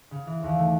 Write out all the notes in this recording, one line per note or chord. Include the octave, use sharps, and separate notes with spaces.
C#3
E3
D#2
A3